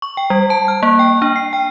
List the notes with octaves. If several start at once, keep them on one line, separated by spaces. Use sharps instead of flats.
C#6
G5
G3
A5
F6
A#3
G5
D4
C7
G5